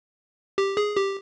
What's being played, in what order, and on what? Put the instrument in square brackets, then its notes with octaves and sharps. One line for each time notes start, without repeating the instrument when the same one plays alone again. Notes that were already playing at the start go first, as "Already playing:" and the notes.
[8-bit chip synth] G4
G#4
G4